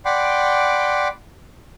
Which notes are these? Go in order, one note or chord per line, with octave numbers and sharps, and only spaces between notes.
D5 F#5 G5 B5 C6 D6